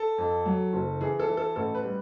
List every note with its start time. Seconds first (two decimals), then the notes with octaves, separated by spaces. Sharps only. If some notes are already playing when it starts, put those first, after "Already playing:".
Already playing: A4
0.18 F2
0.46 F#3
0.73 F#1
1.01 E3 G#4
1.20 A4
1.29 E3
1.37 A4
1.56 A1 A4
1.75 B4
1.84 G3